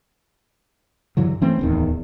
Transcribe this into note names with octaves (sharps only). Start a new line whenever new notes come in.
G2 D3 E3 F#3
E3 A3 C4 C#4
D1 E2 D#3